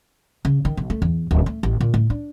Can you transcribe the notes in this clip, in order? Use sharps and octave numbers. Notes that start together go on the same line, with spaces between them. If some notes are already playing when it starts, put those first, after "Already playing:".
C#3
D#3
B1
A3
E2
D1
A3
A1
A#2
A2
D4